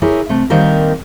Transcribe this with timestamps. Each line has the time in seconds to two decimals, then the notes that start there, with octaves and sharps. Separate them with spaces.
0.02 E4 G4 G#4 A#4 C#5
0.29 C3 A3
0.50 D#3 G3 A#3 C4 G4 A#4